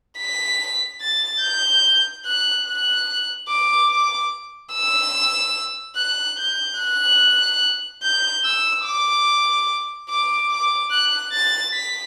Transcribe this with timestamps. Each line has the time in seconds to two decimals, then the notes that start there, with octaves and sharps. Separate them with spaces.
0.18 B6
1.01 A6
1.42 G6
2.25 F#6
2.66 F#6
3.49 D6
3.90 D6
4.73 E6
5.97 F#6
6.37 G6
6.79 F#6
8.03 G6
8.44 E6
8.85 D6
10.09 D6
10.50 D6
10.91 F#6
11.33 A6
11.74 B6